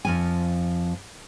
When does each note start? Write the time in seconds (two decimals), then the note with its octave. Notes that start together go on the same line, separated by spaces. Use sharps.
0.05 F2 F3 G#5